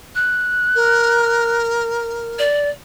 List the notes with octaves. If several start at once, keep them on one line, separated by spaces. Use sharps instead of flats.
F#6
A#4
D5